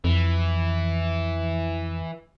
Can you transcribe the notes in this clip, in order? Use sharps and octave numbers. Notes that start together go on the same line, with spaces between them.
F2 E3